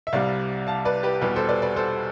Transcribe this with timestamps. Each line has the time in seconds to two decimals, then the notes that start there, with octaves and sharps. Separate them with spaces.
0.07 E5
0.13 C2 C3 G3 D5 F5
0.67 F5 A5
0.85 B4 D5
1.03 G4 B4
1.21 E2 B2 G3 G4 B4
1.36 A4 C5
1.49 B4 D5
1.62 B4 D5
1.76 A4 C5